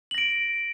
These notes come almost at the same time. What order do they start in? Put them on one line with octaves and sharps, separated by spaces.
F#7 A#6 D7